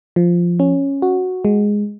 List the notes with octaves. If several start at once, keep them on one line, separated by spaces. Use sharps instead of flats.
F3
C#4
F#4
G#3